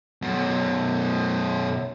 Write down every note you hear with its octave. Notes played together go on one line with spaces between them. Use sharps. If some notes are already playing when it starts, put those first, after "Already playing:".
F#2 B2